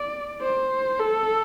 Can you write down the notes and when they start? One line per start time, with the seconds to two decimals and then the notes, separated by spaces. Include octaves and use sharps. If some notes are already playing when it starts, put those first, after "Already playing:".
Already playing: D5
0.42 C5
1.00 A4